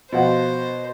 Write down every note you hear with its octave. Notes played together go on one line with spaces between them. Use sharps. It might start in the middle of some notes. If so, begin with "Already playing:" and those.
B2 F3 F4 C5 F#5